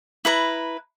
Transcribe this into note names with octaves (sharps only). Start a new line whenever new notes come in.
E4 B4 A#5